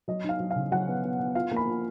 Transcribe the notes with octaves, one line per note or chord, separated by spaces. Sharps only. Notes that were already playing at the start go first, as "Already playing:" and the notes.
F#3 D#5
D#4 F5
F#3
F5
C#3
F#3 F#5
B3
B3
B3
F4 F5
A#3
B5
F3